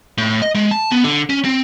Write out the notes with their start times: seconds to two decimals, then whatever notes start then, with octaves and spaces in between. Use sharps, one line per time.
0.18 A2
0.42 D#5
0.55 G#3
0.71 A5
0.91 B3
1.04 D3
1.30 C#4
1.45 C4